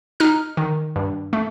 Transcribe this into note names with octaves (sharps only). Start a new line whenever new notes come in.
D#4 F6
D#3
G2
A3